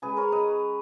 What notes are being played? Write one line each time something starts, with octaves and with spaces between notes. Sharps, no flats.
C#3 G#3 G#4 B4
A#4 C#5
B4 D#5